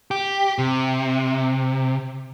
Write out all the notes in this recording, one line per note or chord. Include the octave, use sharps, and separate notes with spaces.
G4
C3